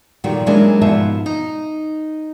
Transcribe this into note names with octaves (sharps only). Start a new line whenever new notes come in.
A#2 D3 D#3 F3 G3 F#4
E3 F#3 G#3 A#3 C#4 D4
G#2 B2 F3 E5 A5
D#4